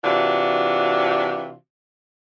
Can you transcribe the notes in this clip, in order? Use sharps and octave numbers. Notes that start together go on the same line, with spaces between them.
C3 E3 D4 F4 F#4